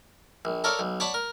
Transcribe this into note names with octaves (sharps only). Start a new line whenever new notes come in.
A#1
A4 A#4 C#5 D5 F5
B1
C#5 D5 F#5 A5 B5
A#4